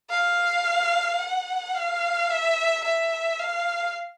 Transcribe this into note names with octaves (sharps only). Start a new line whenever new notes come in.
F5
F#5
F5
E5
E5
F5